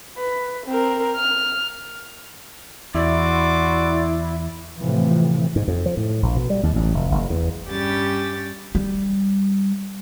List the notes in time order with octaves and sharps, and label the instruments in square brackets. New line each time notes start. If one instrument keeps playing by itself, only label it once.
[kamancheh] B4
C4 A#4
F6
[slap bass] E2 [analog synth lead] E4 [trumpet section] F#4 C6 D6 [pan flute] D5
[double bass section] A2 C3 E3 F3
[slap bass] G#2
F2
F3
A2
A#1
B2
G3
D#2
A1
F1
F#1
E2
[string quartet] G2 G3 C#4 G4 G5 A6
[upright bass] G3